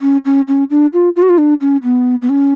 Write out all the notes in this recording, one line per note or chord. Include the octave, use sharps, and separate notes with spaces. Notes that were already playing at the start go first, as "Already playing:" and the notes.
C#4
C#4
C#4
D4
F4
F4
F#4
F4
D4
C#4
B3
B3
C#4